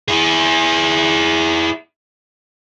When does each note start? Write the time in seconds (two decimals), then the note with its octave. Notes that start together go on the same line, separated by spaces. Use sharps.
0.08 E4 G#4